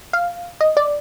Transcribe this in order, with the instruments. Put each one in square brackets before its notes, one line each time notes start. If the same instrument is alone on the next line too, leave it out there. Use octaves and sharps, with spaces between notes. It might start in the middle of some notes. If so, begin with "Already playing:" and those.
[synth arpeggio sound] F5
D#5
D5